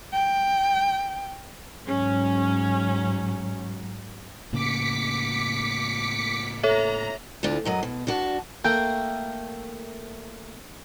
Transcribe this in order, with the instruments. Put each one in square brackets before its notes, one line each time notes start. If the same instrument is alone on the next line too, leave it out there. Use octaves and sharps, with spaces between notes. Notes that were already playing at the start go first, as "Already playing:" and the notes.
[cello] G5
[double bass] G#2 F#3 [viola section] C#4
[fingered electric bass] A2 C#3 A#3 [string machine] D6 B6 C#7
[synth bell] A4 C#5 E5 [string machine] A#5
[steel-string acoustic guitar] D2 D3 D4 F4
F#2 F#3 D#5
B2
G2 D4 F#4 A5
[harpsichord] A3 A#3 A#4 [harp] G5